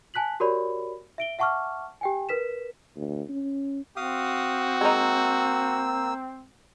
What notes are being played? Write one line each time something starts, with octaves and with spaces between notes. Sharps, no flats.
G#5 A5 F#6 B6 F#7
F#4 G4 A#4 C#5 D5 B5
E5 D7 G7
E5 F#5 A5 C#6 D6 F6
G4 G5 G#5
A#4 B4 B6 E7
D2
C#4
C4 F#4 F5 D#6
G#3 A#3 D#4 E6